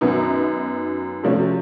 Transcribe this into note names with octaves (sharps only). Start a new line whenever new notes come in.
F#2 D#3 F#3 B3 D#4
C3 F3 A3 C#4 F#4